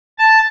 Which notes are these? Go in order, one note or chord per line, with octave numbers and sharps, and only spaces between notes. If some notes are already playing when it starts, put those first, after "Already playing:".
A5